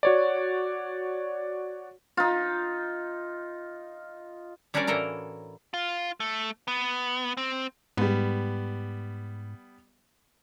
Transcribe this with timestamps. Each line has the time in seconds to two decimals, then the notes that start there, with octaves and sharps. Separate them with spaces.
0.03 F#4 C#5 D5
2.17 D#4 F4
4.74 G3 C#4 D4 F#4 A#4 D5
4.87 A2 E3 A#3 A4 A#4 A#5
5.74 F4
6.20 A3
6.68 B3
7.37 C4
7.97 G#2 G3 B3